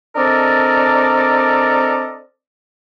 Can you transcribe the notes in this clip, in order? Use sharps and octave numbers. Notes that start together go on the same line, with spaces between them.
C4 D4 A4 A#4 D5 D#5